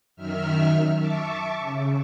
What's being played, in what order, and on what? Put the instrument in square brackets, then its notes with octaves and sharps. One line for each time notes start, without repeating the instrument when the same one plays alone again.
[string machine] F#2 D#3 E5 F6
E5 A5 C#6 D6
C#3